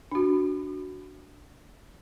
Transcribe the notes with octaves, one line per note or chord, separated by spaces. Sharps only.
D4 F#4